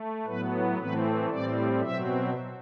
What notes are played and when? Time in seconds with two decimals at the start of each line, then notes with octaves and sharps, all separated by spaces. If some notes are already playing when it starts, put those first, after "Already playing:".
Already playing: A3
0.25 A2 F#3 B3 B4
0.78 A2 E3 A3 C4 B4
1.29 A2 G3 C4 D5
1.82 B2 F#3 C4 E5